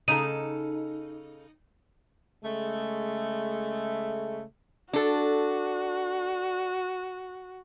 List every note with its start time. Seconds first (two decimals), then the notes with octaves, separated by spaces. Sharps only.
0.08 C#3 D#4 A4 D#7
2.44 C#3 G#3 A3
4.93 D4 F#4 A4